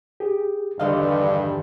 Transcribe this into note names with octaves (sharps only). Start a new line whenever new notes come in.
G4 G#4
E2 G2 D3 D#3 A4 D#5 F5